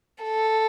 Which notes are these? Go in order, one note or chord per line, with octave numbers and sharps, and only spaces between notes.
A4